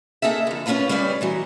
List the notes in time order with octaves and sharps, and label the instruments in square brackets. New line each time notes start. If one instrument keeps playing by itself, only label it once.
[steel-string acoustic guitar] A#3 D#4 G#4 A4 E5
F2 D3
B3 C#4 D4 F4 A4 B4
G3 C#4 D#4 B4 D5
B2 E3 F#3